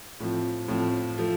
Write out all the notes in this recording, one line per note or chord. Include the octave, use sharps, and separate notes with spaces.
A2 F3 C4
A2 F3 C4
F3 A3